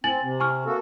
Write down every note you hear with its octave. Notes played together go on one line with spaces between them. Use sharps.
C4 G#5 A6 F#7
C3
G#5 C#6 F6
A#3 F#4 A4